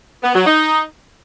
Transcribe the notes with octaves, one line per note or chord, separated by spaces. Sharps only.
B3
F#3
D#4